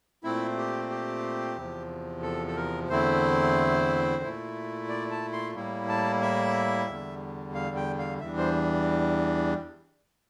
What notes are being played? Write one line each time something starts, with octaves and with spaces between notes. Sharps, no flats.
A#2 A3 C4 E4
G4
G4
E2 C3 F3
A4
A4
A#4
E2 D3 A3 C4 E4 C5
A#2 A3 E4
D5
A5
C6
A2 G3 A#3 E4
A5
E5
E2 D3 G3
F5
G5
F5
E2 E3 G3 D4 E5
C5